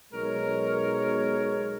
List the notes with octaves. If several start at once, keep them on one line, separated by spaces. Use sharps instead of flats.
B1 G#3 A#4 C#5